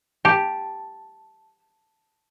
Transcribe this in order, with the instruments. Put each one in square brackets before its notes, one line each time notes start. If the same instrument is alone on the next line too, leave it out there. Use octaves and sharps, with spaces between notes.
[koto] G4 [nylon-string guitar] A5